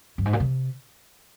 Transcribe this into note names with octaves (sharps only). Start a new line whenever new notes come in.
G2
G#2
A#2
C3